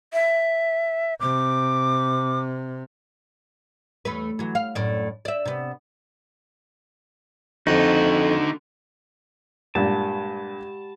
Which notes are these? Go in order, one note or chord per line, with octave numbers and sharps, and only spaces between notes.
E5
C3 D6
E2 A3 B4
E3 F#3
F5
F#2 A2 D5
D5 E5
C3 B3
F2 D3 D#4 F#4
G2 A#2 G#3 G4 F#5 A5 B5